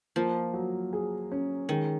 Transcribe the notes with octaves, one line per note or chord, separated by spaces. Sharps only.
F3 A#3
F#3
G#4
C#4
D#3 G#3